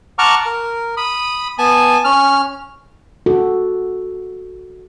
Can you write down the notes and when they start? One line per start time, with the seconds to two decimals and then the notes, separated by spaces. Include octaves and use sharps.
0.19 F#5 A5 A#5 C#6 D6 F6
0.46 A#4
0.97 B5 D#6
1.58 B3 G#5 A5
2.04 C#4 F6
3.26 F#4 A4